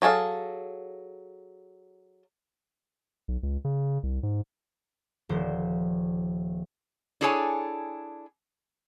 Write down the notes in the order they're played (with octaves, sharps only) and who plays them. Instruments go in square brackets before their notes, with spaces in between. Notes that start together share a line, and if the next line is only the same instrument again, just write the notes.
[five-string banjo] F#3 G#4 A4 F5
[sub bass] B1
C#2
C#3
C2
G#2
[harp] D#1 F3 C5
[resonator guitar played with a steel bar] D4 E4 G#4 A4 C#5 G#5